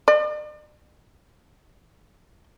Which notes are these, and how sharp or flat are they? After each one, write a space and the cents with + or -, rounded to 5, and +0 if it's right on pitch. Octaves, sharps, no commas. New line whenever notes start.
D5 +45